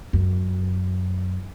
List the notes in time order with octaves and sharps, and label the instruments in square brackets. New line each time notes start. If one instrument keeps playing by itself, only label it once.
[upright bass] F#2